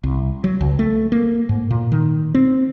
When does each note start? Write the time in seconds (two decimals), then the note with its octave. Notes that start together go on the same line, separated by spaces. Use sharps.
0.04 C2
0.44 F#3
0.61 C#2
0.79 A3
1.12 A#3
1.49 G#2
1.70 A#2
1.92 D#3
2.34 C4